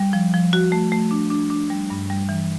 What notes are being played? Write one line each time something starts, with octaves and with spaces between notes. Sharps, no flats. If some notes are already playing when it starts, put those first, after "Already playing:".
Already playing: G3
F3
F3
F#4
A3
A3
D4
D4
D4
G3
G2
G3
E3